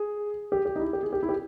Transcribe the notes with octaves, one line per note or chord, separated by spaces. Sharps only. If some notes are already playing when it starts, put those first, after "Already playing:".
Already playing: G#4
G4
G4
D#4
E4
G4
G#4
G4
E4
G4